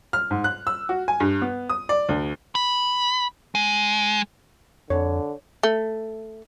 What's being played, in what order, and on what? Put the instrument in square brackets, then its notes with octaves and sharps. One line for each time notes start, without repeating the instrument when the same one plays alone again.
[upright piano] F6
G#2
F#6
E6
F#4
G#5
G2
B3
D#6
D5
D2
[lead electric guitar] B5
G#3
[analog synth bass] F2 [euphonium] D3 [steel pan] C#5
[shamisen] A3